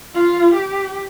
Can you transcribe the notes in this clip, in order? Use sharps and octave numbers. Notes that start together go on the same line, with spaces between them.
F4
G4